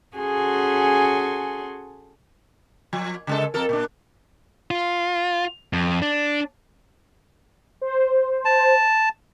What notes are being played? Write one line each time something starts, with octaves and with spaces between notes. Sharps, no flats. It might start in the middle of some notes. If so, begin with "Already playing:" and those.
C#4 F#4 G#4 A4 G#5 C6
F3
C#3 G#3 A4
F2 A4 A#4
A#2 D4
F4
F2
D4
C5
A5